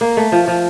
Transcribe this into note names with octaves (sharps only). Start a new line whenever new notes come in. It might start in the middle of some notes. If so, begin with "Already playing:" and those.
A#3
A3
F3
F3